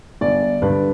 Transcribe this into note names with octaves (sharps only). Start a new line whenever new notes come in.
G1 D5
G2 D3 G3 B4